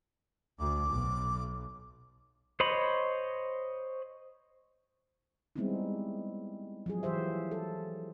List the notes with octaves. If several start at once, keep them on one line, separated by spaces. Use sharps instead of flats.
D2 D6
B1
C5 C#5 D#5 B5
G3 G#3 B3 C4 D#4 E4
F3 F#3 G#4
E3 G4 C5 E5
A4